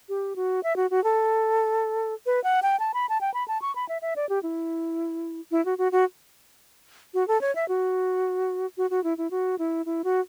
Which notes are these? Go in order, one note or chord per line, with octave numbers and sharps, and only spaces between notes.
G4
F#4
E5
F#4
F#4
A4
B4
F#5
G5
A5
B5
A5
G5
B5
A5
C#6
B5
E5
E5
D5
G4
E4
E4
F#4
F#4
F#4
F#4
A4
C#5
E5
F#4
F#4
F#4
E4
E4
F#4
E4
E4
F#4